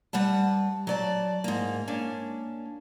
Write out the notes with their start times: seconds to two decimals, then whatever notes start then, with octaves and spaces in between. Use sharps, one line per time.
0.13 G3 B4 F#5 A5
0.87 F#3 D5 A5
1.44 G#2 A#3
1.88 A#3 C#4 D4